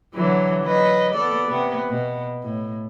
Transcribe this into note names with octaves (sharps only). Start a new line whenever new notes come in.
D3 E3 F#3
F#3 B4 D#5
B3 A4 D5
C3 B3
B2
A2